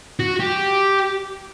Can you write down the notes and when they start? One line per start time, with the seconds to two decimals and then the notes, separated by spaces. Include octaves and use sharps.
0.20 F#4
0.40 G4